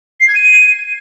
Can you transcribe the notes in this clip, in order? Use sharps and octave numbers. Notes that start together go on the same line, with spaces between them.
C7
G#6
D#7